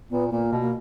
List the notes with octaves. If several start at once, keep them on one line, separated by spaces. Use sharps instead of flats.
A#2 B3
A#2 A#3
B2
A#3